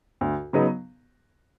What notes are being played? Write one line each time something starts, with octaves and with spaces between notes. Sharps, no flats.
D2
C#3 F#3 B3 D#4